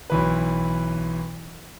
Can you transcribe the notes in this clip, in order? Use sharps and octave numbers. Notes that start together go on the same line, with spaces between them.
B1 E3 B4